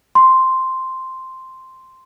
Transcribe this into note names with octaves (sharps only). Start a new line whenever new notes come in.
C6